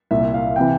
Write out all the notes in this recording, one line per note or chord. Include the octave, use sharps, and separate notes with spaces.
C2 A#2 E5
F5
C3 E3 G5